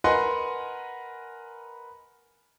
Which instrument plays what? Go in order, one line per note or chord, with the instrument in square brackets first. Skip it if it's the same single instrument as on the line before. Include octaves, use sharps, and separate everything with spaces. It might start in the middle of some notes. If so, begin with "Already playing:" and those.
[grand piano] A#4 B4 D#5 F#5 G#5 C6